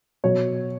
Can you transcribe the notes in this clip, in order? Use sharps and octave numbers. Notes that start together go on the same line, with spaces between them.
B2 F#3 C#5